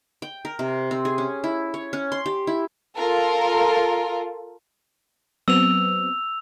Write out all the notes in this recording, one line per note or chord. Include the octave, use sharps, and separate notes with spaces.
G5
A#4
C3
C4
G#4
C#4
E4
C#5
C#4
C6
G4
E4
F4 A4 A#4
F#3 B3 C4 E6 F7